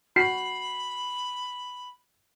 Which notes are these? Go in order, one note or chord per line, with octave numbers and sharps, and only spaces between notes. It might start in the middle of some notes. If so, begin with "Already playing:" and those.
F#4 B5 C7